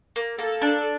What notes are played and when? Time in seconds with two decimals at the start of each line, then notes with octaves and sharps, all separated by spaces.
0.16 A#3
0.39 A#3 A4
0.62 D4